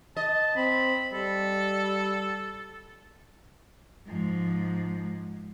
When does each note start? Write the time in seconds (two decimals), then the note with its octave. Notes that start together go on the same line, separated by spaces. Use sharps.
0.17 D#5 A5
0.56 C4 B5
1.13 G3 A4
4.06 G#2 F3